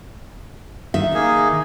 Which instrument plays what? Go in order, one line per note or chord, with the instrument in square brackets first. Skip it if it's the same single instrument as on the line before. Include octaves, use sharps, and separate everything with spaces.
[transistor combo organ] D#3 [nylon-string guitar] E5
[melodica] A#3 G#4